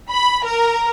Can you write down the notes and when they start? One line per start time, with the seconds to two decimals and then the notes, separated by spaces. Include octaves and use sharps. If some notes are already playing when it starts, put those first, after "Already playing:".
0.10 B5
0.45 A#4